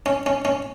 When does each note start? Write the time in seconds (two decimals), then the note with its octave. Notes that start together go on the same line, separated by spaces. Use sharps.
0.06 C#4
0.26 C#4
0.45 C#4